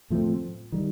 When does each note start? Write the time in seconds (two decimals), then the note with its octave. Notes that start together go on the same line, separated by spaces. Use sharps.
0.10 A2 F3 A3 C4
0.72 D#3 G3